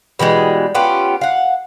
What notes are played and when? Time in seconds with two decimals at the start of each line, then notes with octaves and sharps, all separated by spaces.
0.19 B2 E3 G3 G#3
0.75 B3 C#4 F4 G4
1.21 F5 F#5